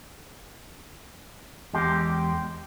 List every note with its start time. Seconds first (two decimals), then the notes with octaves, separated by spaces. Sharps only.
1.73 E2 G#3 G4